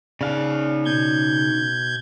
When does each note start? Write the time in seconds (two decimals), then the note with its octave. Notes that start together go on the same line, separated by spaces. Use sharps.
0.21 C#3 D#4 D5 F5
0.85 B2 G6 G#6